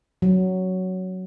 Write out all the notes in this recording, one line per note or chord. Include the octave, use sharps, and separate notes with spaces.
F#3